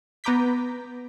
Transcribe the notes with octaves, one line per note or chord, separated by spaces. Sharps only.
B3 B4 A#5 D6 G6 B6